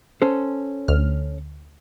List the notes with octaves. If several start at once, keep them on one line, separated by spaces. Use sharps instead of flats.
C#4 A4 C5
D2 F6